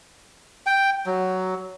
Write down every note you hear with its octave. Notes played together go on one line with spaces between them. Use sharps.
G5
F#3